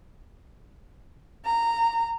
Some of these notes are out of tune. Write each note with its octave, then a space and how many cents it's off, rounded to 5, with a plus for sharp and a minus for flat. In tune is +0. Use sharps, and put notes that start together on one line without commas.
A#5 -15